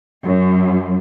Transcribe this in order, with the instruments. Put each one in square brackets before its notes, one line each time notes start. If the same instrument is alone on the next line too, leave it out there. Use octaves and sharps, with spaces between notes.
[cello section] F#2